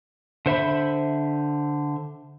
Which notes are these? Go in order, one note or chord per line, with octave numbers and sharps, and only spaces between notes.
D3 C5 E5 B5